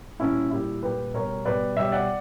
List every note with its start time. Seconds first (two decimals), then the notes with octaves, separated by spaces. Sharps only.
0.20 A#2 G3 C#4 E4
0.51 A#2 G3 E4 G4
0.83 A#2 G3 G4 B4
1.14 B2 G3 A#4 C#5
1.45 B2 G3 B4 D5
1.76 B2 G3 C#5 E5
1.92 D5 F#5